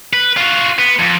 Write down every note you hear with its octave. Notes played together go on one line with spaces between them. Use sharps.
B4
F4 F#4
B3
F2